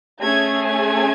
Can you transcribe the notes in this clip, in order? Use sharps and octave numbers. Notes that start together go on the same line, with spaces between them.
A3 C#4 G#4 G#6
G#6